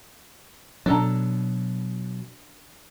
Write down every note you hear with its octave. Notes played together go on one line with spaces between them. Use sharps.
B2 F#3 D4 A4 A#5